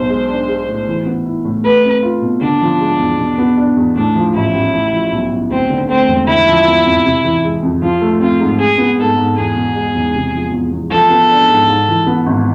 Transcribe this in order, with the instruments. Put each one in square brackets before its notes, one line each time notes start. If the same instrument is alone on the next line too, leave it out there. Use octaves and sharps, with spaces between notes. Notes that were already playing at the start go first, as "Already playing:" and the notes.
Already playing: [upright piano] B1 [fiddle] C5
[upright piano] G#3
D4
G#4
A2
E3
B3
E4
A2
[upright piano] A3 [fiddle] B4
[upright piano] C4
F4
B2
[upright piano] D3 [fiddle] D4
[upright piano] F3
G#3
E2
B2
B3
D4
E2
[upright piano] A2 [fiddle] D4
[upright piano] F3
[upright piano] A1 [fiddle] E4
[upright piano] A1
A2
F3
B1
B1
[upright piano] D2 [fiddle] C4
[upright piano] D3
[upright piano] A3 [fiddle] C4
[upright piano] E1
[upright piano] D3 [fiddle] E4
[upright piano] F3
B3
F2
C3
E3
G#3
F2
[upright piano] F3 [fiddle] F4
[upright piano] A3
[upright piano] C4 [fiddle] F4
[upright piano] G#2
[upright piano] G#3 [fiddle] G#4
[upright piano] B3
[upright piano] G#2 [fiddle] A4
[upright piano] G#2
[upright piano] E2 [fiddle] G#4
[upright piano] B2
G#3
E1
C3
F3
E2
E2
[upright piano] F3 [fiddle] A4
[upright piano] B3
D4
G#2
G#2
E3
B3
G#1